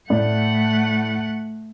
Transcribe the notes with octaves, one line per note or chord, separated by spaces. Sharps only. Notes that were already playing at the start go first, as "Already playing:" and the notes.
A2 A3 D5 F#5